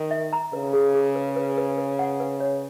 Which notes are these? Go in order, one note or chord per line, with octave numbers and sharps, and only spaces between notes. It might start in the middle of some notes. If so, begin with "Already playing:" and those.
Already playing: D#3
E5
A#5
C#3 B4
G#4
G#4
B4
B4
B4
B4
F#5
B4
C#5